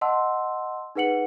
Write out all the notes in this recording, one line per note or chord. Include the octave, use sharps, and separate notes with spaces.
D#5 F#5 A5 C6 E6
D#4 G#4 B4 F#5 C#7 F#7